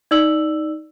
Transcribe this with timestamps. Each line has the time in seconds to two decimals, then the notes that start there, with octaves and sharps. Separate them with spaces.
0.11 D#4 D5 E6 F#7